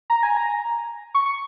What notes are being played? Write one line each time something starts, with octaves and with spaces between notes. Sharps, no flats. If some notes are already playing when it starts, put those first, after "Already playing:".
A#5
G#5
A#5
C#6
C#6